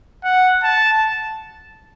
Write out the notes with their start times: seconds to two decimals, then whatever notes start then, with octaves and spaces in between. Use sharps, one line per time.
0.24 F#5
0.63 A5